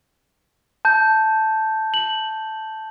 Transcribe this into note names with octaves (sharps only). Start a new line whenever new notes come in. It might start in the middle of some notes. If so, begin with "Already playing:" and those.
A5 G6
F#7